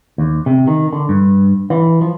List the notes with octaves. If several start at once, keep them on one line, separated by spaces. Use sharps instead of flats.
D#2
C3
D#3
D3
G2
E3
F3